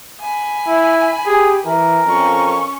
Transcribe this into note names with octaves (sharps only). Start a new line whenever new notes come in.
G#5 B5
E4
G4 G#4
E3 A#4
F2 C#4 C#6